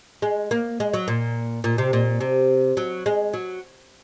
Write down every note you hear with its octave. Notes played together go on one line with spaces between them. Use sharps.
G#3
A#3
G#3
F#3
A#2
A#2
C3
A#2
C3
F#3
G#3
F#3